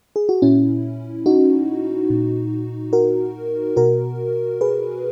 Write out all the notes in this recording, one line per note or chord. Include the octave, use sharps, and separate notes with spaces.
G#4
F#4
A#2 C#4 E4
D#4 F#4
A#2
F#4 A#4
B2 F#4 A#4
G#4 B4